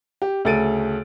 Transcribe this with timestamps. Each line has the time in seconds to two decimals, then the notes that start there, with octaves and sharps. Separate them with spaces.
0.22 G4
0.45 D2 C#3 A4 A6 D7 D#7